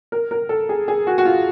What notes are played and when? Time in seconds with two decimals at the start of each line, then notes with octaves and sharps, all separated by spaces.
0.12 A#4
0.31 A#4
0.49 A4
0.69 G#4
0.88 G#4
1.07 F#4
1.18 F#4
1.25 F4